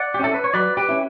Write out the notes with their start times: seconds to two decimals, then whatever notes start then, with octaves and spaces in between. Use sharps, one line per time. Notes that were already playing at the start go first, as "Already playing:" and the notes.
Already playing: D5 F#5
0.14 G4
0.19 C#4 E4 A4
0.34 B4
0.44 C#5
0.54 F#3 B4 D5
0.77 G4 B4
0.89 C#4 E4